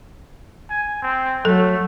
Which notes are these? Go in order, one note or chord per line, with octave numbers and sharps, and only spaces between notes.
G#5
C4
F#3 A3 A4